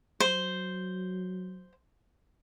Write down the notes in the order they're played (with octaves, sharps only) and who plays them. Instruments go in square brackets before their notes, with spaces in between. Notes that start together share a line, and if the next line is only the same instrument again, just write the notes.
[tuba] F#3 [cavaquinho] C5